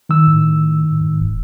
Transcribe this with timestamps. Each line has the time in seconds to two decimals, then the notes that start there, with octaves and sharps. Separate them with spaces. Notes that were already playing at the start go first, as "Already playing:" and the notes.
0.09 D#3 E6
0.27 A2
1.01 G#2
1.21 D#1